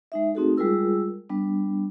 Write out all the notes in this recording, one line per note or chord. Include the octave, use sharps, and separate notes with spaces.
G#3 D#4 E5
A3 C4 D#4 F#4 G#4 A4
G3 G#3 F4 G#4 A#4 E6
G3 B3 D4